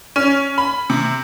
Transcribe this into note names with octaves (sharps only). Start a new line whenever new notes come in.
C#4
B5
C3